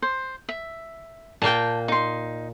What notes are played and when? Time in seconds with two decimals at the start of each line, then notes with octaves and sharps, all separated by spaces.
0.02 C5
0.49 E5
1.42 A#2 A#3 G5 A5
1.88 D#4 C6